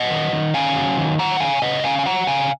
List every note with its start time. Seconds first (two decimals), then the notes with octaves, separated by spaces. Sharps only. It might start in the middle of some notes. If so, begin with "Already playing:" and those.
Already playing: F#3 D#5 F#5
0.10 D#3
0.33 D#3
0.54 C#4 F5 G#5
0.76 F#3
0.98 D#3
1.19 F#3 F#5 A#5
1.40 C#3 F5 G#5
1.62 C#3 D#5 F#5
1.84 C#4 F5 G#5
1.99 G#5
2.06 F#3 F#5 A#5
2.27 C#3 F5 G#5